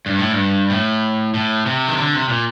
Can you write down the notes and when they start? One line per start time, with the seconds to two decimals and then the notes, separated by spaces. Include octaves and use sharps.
0.06 G2
0.19 A2
0.31 G2
0.70 A2
1.34 A2
1.66 C3
1.88 D#3
1.97 D3
2.13 C3
2.29 A#2